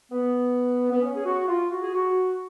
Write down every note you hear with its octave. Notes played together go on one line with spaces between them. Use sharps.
B3
B3
C#4
G#4
F#4
F4
F#4
G#4
F#4